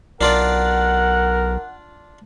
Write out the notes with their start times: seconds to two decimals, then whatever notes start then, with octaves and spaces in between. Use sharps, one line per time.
0.21 B1 D4 F4 A#4 D5 F#5